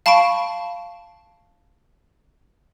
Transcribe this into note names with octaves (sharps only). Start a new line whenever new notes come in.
F5 A5 B5 C#6 D7